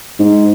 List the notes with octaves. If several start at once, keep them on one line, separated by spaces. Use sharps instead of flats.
G#2